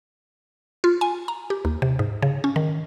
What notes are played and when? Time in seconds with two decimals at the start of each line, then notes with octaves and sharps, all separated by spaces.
0.84 F4
1.01 G#5
1.28 A#5
1.50 G4
1.65 D#2
1.82 C3
1.99 G#2
2.22 C#3
2.44 C#4
2.56 D#3